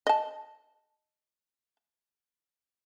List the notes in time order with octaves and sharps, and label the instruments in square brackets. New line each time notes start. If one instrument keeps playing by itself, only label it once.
[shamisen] D#5 A5